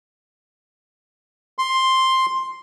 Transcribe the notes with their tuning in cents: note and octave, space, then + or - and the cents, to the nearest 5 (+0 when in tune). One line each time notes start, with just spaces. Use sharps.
C6 +5